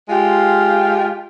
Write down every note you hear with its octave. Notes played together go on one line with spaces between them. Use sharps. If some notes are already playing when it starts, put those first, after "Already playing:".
G#3 F4 G4 F5